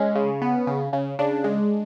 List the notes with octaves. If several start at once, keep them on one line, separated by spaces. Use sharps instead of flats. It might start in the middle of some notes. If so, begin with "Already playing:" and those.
Already playing: G#3 C#4
C#3
B3
C#3
C#3
C#3 D4
G#3